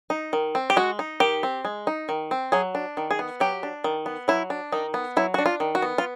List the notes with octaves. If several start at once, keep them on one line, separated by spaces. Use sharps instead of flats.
D#4
D#3
C4
G4
G#3 F#4
D#4
D#3 G4
C4
G#3
D#4
D#3
C4
F#3 G#4
D4
D#3
G#4
B3
F#3 G4
D4
D#3
B3
F#3 E4
D4
D#3 D#4
B3
F#3 E4
D4 F#4
F4
D#3
F#4
B3
F4